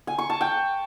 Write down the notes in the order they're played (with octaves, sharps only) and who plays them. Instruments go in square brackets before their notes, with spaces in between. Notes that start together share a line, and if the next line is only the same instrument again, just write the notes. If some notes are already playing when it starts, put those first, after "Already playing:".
[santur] G#5
C#6
A5
G5